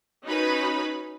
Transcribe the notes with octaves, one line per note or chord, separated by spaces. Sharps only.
C#4 D#4 F#4 B4 B5